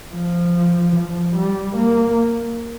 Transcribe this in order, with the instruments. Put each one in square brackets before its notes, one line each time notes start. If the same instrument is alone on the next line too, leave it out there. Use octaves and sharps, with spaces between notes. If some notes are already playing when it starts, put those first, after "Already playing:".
[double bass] F3
F3
G3
A#3